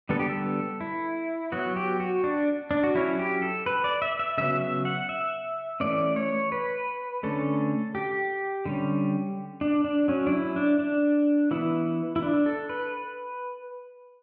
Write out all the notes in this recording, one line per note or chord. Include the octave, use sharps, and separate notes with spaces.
D3 G3 B3 A4
G4
A4
E4
F#3 B3 F#4
G4
F#4
D4
D4
F#4
F#3 C#4 E4
G4
A4
B4
D5
E5
E5
C#3 F#3 B3 E5
E5
F#5
E5
E3 A3 C#4 D5
C#5
B4
D3 A3 C#4 A4
G4
D3 G3 C#4
D4
D4
F#3 C#4
D4
E4
D4
D4
E3 B3 E4
E4
D4
A4
B4